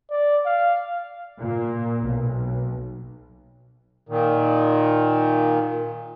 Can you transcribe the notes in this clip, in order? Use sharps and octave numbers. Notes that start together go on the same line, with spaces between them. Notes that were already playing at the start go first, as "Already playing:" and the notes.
D5
F5
A#2
B1
A#2 D#3